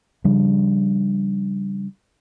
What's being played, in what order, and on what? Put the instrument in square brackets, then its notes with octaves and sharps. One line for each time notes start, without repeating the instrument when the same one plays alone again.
[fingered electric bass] C#3 F3 G3 D4